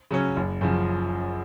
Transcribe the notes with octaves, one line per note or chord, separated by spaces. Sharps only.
C#3 F#3 C#4
F#1
F#2 C#3 F3